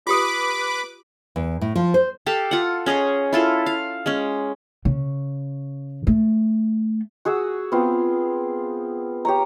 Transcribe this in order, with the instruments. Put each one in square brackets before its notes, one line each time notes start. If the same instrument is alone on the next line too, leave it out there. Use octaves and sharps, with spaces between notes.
[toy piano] F4 G4 D#6 [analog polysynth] B4 D6 [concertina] B5
[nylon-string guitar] E2
A2
F3
C5
[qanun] G4 A4 F5 A5
F4 F#5
C#4 G#4 C#5 D#5
E4 F4 A4
F5
G#3 C#4
[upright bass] C#3
A3
[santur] F#4 G#4 F#5 E6
B3 C4 F4
G4 C#5 A#5